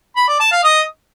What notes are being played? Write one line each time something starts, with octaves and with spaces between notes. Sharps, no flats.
B5
D5
A5
F5
D#5